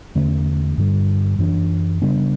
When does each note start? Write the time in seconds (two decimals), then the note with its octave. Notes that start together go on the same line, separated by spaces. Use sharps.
0.15 E2 D3 A3 C#4
0.78 G2 D3 G3
1.39 F#2 E3 B3 D4
2.02 C#3 G3 B3 D4